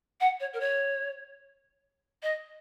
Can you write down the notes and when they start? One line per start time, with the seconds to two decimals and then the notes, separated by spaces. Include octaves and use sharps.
0.20 F#5
0.40 C#5
0.53 A#4
0.60 C#5
2.22 D#5